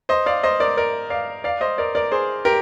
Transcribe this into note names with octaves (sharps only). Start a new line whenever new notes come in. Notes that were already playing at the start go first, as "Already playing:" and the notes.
C5 D#5
D5 F5
C5 D#5
A#4 D5
A#4 D5
D5 F5
D5 F5
C5 D#5
A#4 D5
A#4 D5
G#4 C5
G4 A#4